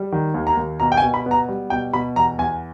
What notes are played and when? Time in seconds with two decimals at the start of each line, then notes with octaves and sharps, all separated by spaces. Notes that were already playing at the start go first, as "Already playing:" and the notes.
Already playing: G3
0.12 D#3
0.34 D#2
0.47 A#5
0.57 D#2
0.80 B2 A#5
0.92 G5
0.97 G#5
1.02 B2
1.14 B5
1.26 B3
1.31 A#5
1.48 G3
1.70 B2 G5
1.93 B2 B5
2.16 E2 A#5
2.38 E2 G#5